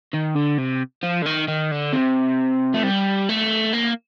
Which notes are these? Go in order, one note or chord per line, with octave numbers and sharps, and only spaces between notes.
D#3
D3
C3
F3
D3
D#3
D#3
D3
C3
A3
G3
A3
A#3